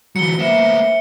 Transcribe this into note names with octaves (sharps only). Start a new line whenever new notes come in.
E3 F#3 C#7 G7
A#3 B3 C5 E5